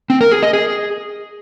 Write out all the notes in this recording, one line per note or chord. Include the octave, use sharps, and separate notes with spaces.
C4
A#4
G#4
D#5
G#4